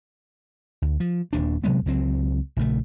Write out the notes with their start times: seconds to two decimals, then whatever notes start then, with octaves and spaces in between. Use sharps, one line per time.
0.82 D2
1.00 F3
1.33 D#1 D#2 D4
1.64 C3 F#3 G#3 B3
1.86 C#2 F#3 C4
2.57 A#1 C#3 A3